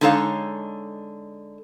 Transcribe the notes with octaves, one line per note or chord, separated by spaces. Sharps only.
D3 G#3 D#4 A4 C#5 F5